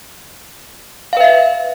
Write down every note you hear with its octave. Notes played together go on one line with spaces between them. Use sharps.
B4 E5 F5